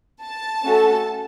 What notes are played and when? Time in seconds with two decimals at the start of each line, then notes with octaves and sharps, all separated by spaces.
0.22 A5
0.63 A3 C#4 F#4 A4